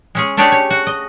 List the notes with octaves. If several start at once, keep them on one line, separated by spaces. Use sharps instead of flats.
G#3 C#4 G#4
A3 C#4 D4 G4 G#4 C#5
C#5
F#4
D#5